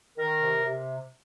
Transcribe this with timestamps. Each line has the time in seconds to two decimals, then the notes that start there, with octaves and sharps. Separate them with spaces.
0.17 D#3 A#4
0.41 C3
0.64 C3